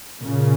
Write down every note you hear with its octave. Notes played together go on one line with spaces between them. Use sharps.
A#2 C#3